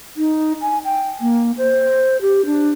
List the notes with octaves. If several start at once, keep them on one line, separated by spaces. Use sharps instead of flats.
D#4
G#5
G5
A#3
C5
G4
D4